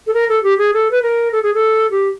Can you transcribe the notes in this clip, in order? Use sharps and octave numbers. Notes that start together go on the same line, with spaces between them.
A4
A#4
A4
G4
G#4
A4
B4
A#4
A4
G#4
A4
G4